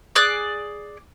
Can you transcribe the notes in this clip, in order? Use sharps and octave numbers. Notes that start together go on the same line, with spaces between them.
G#4 D5 D6 F#6